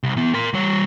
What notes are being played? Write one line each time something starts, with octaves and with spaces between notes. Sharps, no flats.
C2
E3 B3
A#4 C6
G3 C#5